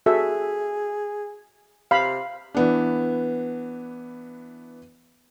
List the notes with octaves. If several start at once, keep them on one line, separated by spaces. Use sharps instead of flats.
F#4 G#4 A4 E5
C3 F5 B5
E3 B3 D4